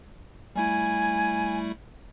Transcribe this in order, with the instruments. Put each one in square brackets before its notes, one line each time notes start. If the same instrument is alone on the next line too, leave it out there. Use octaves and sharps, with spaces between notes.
[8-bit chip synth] G3 A3 E4 [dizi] G#5